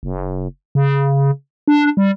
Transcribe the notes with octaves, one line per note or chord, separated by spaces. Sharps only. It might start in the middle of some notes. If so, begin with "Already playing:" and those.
F#1
C#3
D4
G3